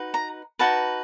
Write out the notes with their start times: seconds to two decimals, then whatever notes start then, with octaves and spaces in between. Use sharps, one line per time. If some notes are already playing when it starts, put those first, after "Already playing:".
Already playing: D#4 F#4 B4
0.14 A#5
0.59 D#4 F#4 B4 A5